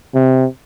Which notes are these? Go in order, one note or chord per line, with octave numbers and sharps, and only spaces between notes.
C3